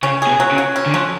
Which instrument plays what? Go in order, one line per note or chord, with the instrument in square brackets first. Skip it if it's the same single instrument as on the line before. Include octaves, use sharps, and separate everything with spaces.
[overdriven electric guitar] C#3 [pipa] C#4
[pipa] G#4
[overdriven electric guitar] B2
[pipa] F#3
[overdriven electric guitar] C#3
[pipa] F#3
C#4
[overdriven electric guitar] D3
[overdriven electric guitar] F3 [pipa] F#3